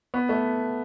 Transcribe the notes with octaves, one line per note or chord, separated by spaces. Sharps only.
B3
A3